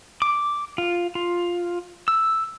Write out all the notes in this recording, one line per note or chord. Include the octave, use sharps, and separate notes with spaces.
D6
F4
F4
E6